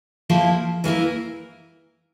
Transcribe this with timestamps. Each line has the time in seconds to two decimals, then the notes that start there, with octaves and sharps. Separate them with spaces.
0.30 F3 A#3 E4
0.84 E3 A#3 E4 A#4